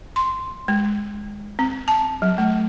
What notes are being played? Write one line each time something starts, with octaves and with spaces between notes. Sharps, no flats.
C6
G#3
C4
A5
F#3
A3